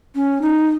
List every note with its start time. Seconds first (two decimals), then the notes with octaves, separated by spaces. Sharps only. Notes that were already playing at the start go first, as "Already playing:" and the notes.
0.15 C#4
0.42 D#4